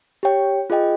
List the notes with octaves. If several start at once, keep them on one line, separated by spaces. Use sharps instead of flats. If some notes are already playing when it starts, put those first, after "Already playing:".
G4 C#5 G5
F4 G#4 D#5 G5